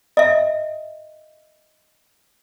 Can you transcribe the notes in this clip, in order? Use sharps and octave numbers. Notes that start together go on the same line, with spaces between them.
D#5 E5